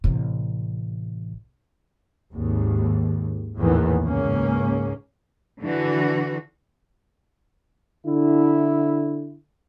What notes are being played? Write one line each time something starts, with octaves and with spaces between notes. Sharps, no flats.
A1 C3
G#1 D#2
A#1 E2 A2 D#3 E3 B3
C#2 G#2 A#3 C#4
D3 E3 F#4
D3 E4